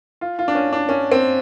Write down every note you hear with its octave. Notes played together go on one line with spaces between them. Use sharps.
F4
F4
D4
C#4
D4
C#4
C4